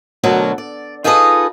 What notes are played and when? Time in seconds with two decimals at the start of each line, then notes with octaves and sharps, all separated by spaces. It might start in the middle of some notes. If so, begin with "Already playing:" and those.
0.23 D2 B2 F#3 A4 A#4
0.58 D5
1.04 D#4 F4 G#4 A4 B4 D#5